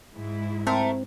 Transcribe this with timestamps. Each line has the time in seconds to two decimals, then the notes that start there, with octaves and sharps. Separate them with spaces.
0.15 G#2 G#3 E4
0.67 A3 C4 A#4